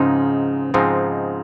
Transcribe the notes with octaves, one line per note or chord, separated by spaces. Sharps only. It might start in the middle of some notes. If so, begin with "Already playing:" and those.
Already playing: G#2 C#3 F3 G#3 C4 D#4
G#2 F3 G#3 C4 D#4